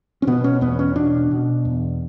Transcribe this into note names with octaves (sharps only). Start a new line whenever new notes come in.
C#4
B2 B3
C#4
E2 B3
C#4
B2 D4
B2
E2